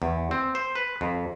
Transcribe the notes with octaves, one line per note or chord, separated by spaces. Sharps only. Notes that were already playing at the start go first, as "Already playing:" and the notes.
E2
C4
C5
B4
F2